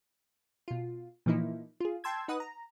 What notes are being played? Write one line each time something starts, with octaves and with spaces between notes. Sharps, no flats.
B2 F4
A#2 E3 F3 A#3 D#4 E4
F4 G#4
G5 A5 C6 E6 G#6
D#4 B4 F#5 D#6
A#5